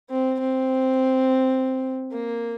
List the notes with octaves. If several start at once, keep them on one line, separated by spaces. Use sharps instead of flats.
C4
C4
A#3